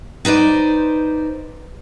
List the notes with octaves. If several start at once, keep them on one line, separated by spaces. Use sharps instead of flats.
D#4 B4 C5 D5